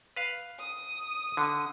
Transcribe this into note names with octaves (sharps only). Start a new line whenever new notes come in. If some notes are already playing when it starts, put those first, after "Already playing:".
B4 F5
D#6
D3